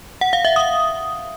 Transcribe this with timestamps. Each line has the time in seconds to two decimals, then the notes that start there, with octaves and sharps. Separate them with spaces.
0.21 F#5
0.33 F5
0.45 E5
0.56 D#6